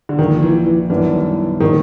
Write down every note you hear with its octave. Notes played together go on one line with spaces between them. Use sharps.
D3
A#1 A#2 D#3 F3
E3
E3
F#2 D#3 E3 G3 B3 D4
A#2 D#3 G3 C4 D#4